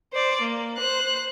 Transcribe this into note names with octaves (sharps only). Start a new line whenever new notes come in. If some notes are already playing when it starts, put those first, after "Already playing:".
C5 D5
A#3
C5 F#6